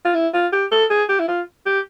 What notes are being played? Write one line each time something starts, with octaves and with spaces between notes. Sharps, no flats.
F4
E4
F4
G4
A4
G#4
G4
E4
F4
G4